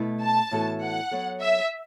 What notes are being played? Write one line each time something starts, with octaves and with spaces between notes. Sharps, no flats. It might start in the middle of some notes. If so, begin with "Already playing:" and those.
Already playing: B2 A3 E4 B4
A5
A2 E3 B3 F#4 A4
F#5
F#3 B3 A4 C#5
E5